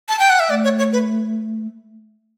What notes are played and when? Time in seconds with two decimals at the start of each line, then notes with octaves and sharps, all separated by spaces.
0.09 A5
0.19 G5
0.30 F#5
0.40 E5
0.49 A3 D5
0.64 C#5
0.78 C#5
0.93 B4